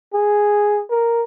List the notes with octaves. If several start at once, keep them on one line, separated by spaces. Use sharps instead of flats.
G#4
A#4